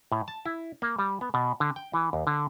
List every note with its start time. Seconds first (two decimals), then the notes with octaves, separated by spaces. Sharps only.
0.12 A2
0.28 A5
0.46 E4
0.82 A#3
0.99 G3
1.21 B3
1.34 B2
1.60 D3
1.76 G5
1.94 E3
2.13 D#2
2.27 D3